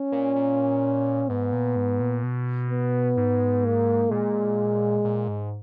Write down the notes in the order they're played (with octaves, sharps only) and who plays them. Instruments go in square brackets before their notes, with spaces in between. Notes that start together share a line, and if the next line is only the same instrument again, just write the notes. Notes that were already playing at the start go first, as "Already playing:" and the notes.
Already playing: [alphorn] C#4
[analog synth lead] A#2
A#2
[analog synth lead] G#2 [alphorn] B3
[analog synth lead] A#2
G#2
A#2
B2
[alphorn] B3
[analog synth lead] G#2
[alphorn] A#3
[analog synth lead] A#2 [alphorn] G#3
[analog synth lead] A#2
G#2